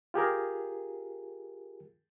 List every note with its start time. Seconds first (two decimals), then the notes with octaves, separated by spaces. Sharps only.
0.14 F4 G4 G#4 A#4